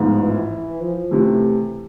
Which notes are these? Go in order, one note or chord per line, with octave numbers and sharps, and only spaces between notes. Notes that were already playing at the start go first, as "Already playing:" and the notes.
Already playing: A1 G#2 F3 B3
E3
F3
C3 E3 A3